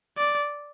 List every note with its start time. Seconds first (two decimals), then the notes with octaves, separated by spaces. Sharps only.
0.17 D5